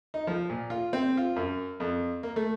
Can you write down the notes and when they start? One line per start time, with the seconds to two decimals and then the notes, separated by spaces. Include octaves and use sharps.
0.14 D#4
0.27 F3
0.50 A#2
0.70 F4
0.93 C4
1.17 F4
1.36 F#2
1.80 F2
2.23 A#3
2.36 A3